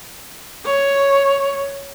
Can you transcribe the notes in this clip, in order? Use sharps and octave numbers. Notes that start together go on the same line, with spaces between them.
C#5